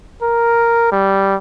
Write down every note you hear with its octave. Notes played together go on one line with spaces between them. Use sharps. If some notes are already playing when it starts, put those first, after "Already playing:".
A#4
G3